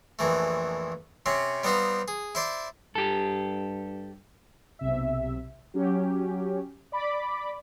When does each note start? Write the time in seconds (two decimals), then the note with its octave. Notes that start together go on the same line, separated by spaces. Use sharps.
0.19 A#1 F2 E3 A3
1.26 C3 C4 C#4
1.64 G3 B3 C4 D#4 F4
2.08 G#4
2.35 E4 C5 D5
2.95 G2 G4 A4
4.79 B1 C3 E5
5.74 F#3 C#4 G4
6.92 D5 B5 D6